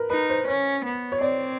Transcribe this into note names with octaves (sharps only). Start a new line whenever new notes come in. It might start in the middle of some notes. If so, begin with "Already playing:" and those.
Already playing: A#4 B4
D#4 B4
C5
C#4 C#5
B3
C#5
C4 D5